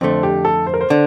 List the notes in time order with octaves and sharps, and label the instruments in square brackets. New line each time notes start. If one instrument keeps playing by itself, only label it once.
[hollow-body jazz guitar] F2 D3 A3 [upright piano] C4
[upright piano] G4
A4
C5
A#4
C5
[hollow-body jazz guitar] D3